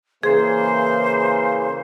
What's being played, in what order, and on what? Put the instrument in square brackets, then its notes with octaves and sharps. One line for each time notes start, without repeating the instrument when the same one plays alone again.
[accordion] C#3 E3 A#3 [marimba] G#4 [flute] C5